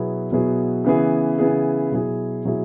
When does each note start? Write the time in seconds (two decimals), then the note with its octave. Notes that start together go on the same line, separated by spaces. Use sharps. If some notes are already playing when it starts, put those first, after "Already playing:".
Already playing: B2 F#3 B3 E4 G#4
0.31 B2 F#3 B3 E4 G#4
0.85 C#3 E3 B3 E4 G#4
1.38 C#3 E3 B3 E4 G#4
1.91 B2 F#3 E4 G#4
2.45 B2 F#3 E4 G#4